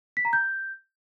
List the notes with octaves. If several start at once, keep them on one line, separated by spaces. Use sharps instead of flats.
B6
A#5
G6